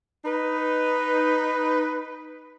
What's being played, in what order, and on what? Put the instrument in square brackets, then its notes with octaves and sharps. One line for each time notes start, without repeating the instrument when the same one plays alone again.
[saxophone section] D#4 B4